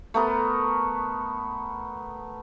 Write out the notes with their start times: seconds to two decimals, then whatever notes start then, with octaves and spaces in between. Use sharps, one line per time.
0.14 A3 B3 A#4